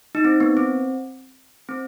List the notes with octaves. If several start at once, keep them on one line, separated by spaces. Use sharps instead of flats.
D#4
C4
B3
C4
C4